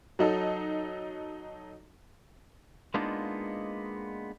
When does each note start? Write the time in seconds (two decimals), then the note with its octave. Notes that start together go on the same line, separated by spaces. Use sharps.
0.19 F#3 D#4 A4
2.94 G#3 A#3 B3 D4 D#4 F4